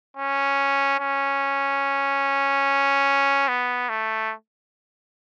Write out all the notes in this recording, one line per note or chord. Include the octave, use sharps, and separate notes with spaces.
C#4
C#4
B3
A3